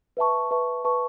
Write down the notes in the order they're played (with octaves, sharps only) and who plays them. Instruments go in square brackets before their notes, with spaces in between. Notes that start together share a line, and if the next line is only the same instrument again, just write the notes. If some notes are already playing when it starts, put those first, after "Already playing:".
[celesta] B4 E5 A5 C#6
B4 E5 A5 C#6
B4 E5 A5 C#6